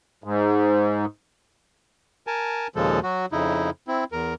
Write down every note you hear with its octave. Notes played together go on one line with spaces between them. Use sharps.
G#2
A#4 G#5 A5
D#2 A#2 C#3 F3 G#3 A4
F#3 F#4
F2 C#3 D#4 E4
C4 E4
E2 A#4